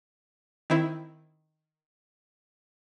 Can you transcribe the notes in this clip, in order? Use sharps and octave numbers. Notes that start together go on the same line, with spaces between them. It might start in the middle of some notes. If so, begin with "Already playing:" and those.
D#3 C4 E4